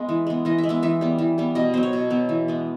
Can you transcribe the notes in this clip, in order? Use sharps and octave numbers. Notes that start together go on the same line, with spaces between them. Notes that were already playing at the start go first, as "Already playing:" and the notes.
Already playing: G#3 B3
E3
G#3 B3
E3 D#5
E5
G#3
B3 E5
E3 E5
G3 B3
E3
G3 B3
B2 D#5
F#3 B3 C5
C#5
B2
F#3 B3
E3
G#3 B3